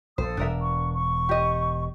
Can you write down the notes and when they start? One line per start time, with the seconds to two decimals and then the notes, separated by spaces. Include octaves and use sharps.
0.18 A#1 A4 C5 D#6
0.37 E1 D4 A#4 E5
0.62 C#6
0.94 C#6
1.29 G4 D#5